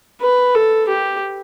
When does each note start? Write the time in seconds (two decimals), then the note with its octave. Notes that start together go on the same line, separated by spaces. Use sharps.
0.21 B4
0.55 A4
0.89 G4